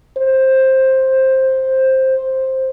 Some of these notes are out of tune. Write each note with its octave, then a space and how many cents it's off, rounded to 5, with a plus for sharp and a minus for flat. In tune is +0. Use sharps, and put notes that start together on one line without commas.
C5 +10